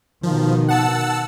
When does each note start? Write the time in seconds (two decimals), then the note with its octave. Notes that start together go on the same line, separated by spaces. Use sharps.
0.23 B2 D#3 F3
0.68 F#5 A5 E6